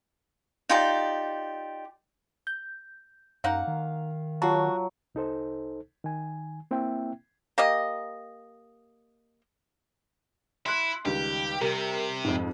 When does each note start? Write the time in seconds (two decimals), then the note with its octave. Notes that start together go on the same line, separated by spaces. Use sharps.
0.69 D#4 F4 G4 D5
2.47 G6
3.44 F#2 A#3 D#4 F5 F#5
3.68 D#3
4.42 F#3 F4 F#4 A5
5.15 C2 D#4 A4 C5
6.04 D#3 G#5
6.71 A#3 C4 E4 E5 G5
7.58 A#3 G4 D#5
10.66 E4 C6 F#6
11.05 C#2 D#3 G3 G4
11.61 C3 G3 A#4
12.24 F2 G#2